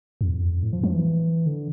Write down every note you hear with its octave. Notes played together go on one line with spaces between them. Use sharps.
F2
E2
F2
A2
F3
F3
E3
D3